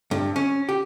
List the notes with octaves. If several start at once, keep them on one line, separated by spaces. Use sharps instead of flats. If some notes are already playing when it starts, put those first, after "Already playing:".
G2
C#4
G4